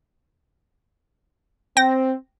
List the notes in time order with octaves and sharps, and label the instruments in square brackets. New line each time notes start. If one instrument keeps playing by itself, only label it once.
[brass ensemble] C4 [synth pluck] G5 A#6